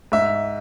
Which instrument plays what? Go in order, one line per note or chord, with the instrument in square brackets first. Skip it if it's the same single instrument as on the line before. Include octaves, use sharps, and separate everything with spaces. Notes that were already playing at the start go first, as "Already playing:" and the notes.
[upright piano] G#2 E5